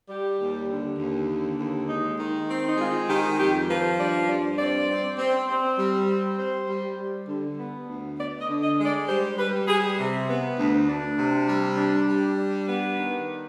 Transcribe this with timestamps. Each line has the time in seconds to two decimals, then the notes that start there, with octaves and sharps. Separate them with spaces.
0.09 G3 G4
0.39 D#2
0.68 D3
0.98 D#2
1.28 D3
1.59 D#2
1.88 G#3 D#4
2.19 D#3
2.48 C4
2.67 D#4
2.78 G#3 F4
3.08 D#3 G4
3.38 F2 G4
3.68 F3 B4
3.98 G2 D5
4.28 G2 D5
4.58 C4 D5
4.89 C4
5.18 C4
5.49 C4
5.78 G3
6.09 C4
6.38 G3 C5
6.68 G3
6.99 G3
7.28 D3
7.58 B3
7.87 D2
8.17 B3 D5
8.40 D#5
8.49 D3
8.63 D#5
8.79 G#3
8.86 D5
9.08 G3 C5
9.38 G3 B4
9.67 G3 G#4
9.98 C3
10.28 B3
10.58 D2
10.87 D4
11.18 C3
11.48 G3
11.77 D4
12.08 G3
12.37 D4
12.67 B3 B4
12.97 D#3